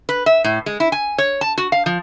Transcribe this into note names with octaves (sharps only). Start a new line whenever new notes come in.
B4
E5
A2
G#3
E4
G#5
C#5
A5
F#4
F5
F3